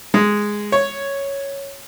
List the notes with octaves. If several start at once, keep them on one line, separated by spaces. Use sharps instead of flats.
G#3
C#5